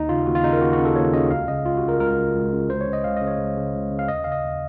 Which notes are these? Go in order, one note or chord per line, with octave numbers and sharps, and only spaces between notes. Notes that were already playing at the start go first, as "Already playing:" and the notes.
Already playing: D#2 D#4
C#3 F4
D#2 F#4
F4
C#3 D#4
A#4
D#2 F#4
F#4
C#3
A4
D#2 C#5
C#3 D#5
C#2 F5
C#3 D#5
C#2 F4
F#4
C#3
A#4
C#2 A#4
C#3
C#2
C#3
C#2 C5
C#5
C#3
D#5
C#2 F5
C#3 D#5
C#5
C#2
C#3
C#2
C#3
F5
D#2 D#5
C#3 F5
D#5
D#2